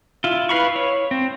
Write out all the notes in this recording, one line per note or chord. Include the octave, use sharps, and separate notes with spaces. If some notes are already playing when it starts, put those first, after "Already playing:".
E4 F4
E4 B4 F5 B5 C#6
C#5
C4